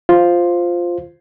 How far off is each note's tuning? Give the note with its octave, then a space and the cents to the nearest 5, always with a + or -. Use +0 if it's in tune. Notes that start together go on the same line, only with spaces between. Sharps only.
F4 +0 C5 +0